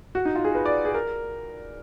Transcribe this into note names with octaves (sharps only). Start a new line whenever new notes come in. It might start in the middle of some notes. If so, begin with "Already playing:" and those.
F#4
D#4
F4
G#4
B4
D5
G#4
A#4